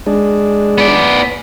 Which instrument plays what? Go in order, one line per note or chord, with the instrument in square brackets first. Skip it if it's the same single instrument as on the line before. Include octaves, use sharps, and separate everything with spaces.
[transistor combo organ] G#3 D4
[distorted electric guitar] B3 D5